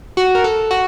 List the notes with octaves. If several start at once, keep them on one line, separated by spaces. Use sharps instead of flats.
F#4
A#4
A4
F#4